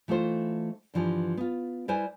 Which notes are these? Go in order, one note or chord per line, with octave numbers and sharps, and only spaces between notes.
E3 A3 D#4 F4 C5
G2 D3 E3 F3 G3
B3 F4
G3 E4 B4 C5 G#5